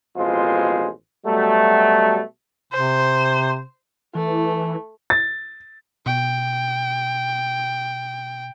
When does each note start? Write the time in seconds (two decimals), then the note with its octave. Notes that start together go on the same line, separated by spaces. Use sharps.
0.16 A1 F2 B2 G#3 F4 C5
1.26 B2 F#3 G3 A3
2.73 C3 C5
4.15 E3 A3
5.10 A6
6.06 B2 G5